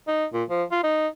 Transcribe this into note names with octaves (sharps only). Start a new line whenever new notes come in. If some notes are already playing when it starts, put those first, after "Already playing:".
D#4
A#2
F3
F4
D#4